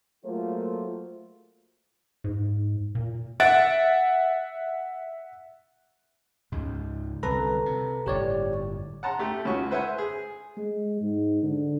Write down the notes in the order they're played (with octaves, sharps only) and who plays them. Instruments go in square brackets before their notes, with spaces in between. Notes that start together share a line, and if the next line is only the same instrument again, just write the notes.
[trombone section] F#3 A3 A#3 F4 G#4 C5
[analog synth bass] G#2
A#2
[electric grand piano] E5 F#5 F#6 A6 D7
[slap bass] C#2 G#2
[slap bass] C2 D3 [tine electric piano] A4 B4 A#5
[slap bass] C3
[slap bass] G1 A2 [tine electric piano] G4 C#5 D5
[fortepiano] F#5 A5 A#5 C6
A3 G4
C#2 C#4 F#4 C#6
B4 C5 E5 F#5 G#5
G#4
[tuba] G#3
G#2
D3